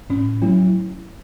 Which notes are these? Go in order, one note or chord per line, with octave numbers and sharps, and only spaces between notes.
A2 C#4
F#3 A3 C#4 E4